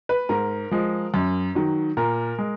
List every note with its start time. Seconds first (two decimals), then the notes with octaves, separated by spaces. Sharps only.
0.09 B4
0.29 G#2 A#4
0.71 F3 G#3
1.14 F#2
1.55 D#3 F#3
1.97 A#2 A#4
2.38 G#3